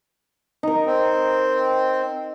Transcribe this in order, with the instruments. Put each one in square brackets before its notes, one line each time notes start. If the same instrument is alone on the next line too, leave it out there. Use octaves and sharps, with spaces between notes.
[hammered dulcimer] D#4 A#4
[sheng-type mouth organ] C4